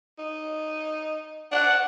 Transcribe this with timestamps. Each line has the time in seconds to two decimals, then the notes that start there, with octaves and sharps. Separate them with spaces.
0.19 D#4
1.52 D4 F#5